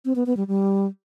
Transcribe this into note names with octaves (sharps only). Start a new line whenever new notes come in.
C4
B3
B3
G3
G3